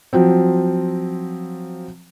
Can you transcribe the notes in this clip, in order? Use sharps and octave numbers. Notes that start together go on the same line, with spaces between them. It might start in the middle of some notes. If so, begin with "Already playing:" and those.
F3 F#3 C4